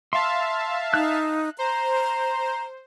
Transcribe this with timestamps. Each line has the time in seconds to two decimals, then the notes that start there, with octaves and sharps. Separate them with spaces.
0.13 E5 F5 A5 C6
0.94 D#4 F#6
1.59 C5 A#5